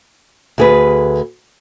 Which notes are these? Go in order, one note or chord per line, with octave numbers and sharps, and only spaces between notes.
D2 G#4 B4